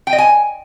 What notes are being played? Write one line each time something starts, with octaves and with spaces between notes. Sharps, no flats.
G5
D#5
G#5